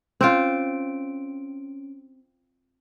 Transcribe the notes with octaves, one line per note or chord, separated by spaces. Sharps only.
C4 C#4 F4 D7